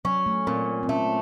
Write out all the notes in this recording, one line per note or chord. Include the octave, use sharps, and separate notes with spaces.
F#3 C#4
A3
A#2 C4
C4
A3 C#4